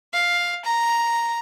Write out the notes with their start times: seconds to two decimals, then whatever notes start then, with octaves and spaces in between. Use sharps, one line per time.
0.13 F5
0.64 A#5